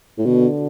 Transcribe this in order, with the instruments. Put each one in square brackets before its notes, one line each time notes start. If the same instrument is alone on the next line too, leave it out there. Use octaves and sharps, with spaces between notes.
[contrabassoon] A2
[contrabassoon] B2 [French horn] D3